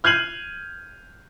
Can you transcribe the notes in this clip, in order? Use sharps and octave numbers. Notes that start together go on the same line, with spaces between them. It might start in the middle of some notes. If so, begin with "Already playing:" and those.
F6 G6 G#6 C7 D#7 F#7